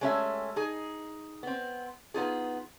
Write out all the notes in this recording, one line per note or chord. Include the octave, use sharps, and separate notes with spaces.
G#3 A3 C#4 G4 A4 E5
D#4 G#4
B3 C4
B3 D#4 F4 G#4